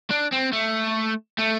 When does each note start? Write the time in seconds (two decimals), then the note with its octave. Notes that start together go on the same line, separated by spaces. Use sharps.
0.10 D4
0.32 C4
0.53 A3
1.39 A3